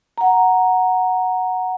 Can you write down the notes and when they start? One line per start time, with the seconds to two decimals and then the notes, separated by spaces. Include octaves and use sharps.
0.18 F#5 A#5